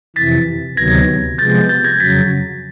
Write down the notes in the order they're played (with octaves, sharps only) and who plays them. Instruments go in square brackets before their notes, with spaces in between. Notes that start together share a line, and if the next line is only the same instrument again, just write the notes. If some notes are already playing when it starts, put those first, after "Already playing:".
[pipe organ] F2 C3 E3 [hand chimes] A6 B6
[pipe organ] D2 C3 D#3 F#3 B3 [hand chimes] G#6 A#6
[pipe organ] C3 F3 G#3 B3 [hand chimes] G6 A6
[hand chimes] G6 A6
G#6 A#6
[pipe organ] F2 C#3 F#3 [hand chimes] A6 B6